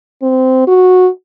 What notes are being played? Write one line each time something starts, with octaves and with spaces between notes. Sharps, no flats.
C4
F#4